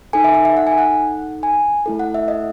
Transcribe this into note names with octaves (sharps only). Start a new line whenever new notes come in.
D#4 A4 G#5
E5
E5
E5
F#5
G#5
F#5
G#5
A3 E4 A4
F#5
E5
D#5